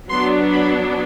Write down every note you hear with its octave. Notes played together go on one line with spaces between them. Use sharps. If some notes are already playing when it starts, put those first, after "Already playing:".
F#3 B3 D4 C6
B5